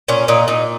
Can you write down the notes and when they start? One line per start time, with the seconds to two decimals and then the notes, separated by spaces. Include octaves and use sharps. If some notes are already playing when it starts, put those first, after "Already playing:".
0.08 A#2 C#4
0.28 A#2 D#4
0.48 A#2 D#4